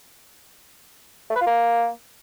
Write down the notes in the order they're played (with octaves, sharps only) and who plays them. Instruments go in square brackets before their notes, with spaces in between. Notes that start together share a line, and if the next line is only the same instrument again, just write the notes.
[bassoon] A3
B4
F4
A#3